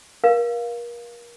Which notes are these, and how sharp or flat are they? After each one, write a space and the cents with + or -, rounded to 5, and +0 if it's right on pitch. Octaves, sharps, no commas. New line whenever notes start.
A#4 +35 F5 +0